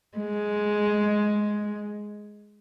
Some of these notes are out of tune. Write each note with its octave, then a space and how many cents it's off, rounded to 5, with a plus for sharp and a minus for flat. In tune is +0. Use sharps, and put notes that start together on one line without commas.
G#3 +5